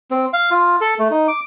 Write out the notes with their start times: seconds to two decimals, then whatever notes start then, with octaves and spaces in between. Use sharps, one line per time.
0.11 C4
0.33 F5
0.51 F4
0.81 A4
0.99 A3
1.11 D#4
1.28 D6